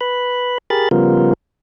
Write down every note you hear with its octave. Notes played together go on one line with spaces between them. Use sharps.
B4 B5
G4 G#4 A#4 B5 A6
C#3 F3 G3 B3 F4 A#4